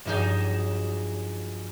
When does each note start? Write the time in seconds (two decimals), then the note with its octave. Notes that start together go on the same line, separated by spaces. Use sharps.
0.05 G2 F3 F#3 D#4 G#4 G6